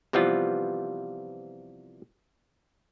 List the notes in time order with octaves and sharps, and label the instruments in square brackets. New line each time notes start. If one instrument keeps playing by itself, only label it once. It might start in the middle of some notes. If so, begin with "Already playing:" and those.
[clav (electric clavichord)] C3 E3 F3 G3 B3 F4